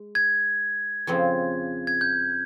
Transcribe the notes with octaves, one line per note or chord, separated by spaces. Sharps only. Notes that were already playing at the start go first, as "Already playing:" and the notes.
Already playing: G#3
G#6
F2 C#3 F3 C4
G#6
G6